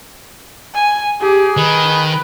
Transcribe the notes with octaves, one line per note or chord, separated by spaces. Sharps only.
G#5
G4 G#4
D#3 B4